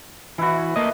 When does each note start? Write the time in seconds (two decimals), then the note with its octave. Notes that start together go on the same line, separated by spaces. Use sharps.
0.38 E3 E4 F#4 B4
0.76 A3 A#3 D#5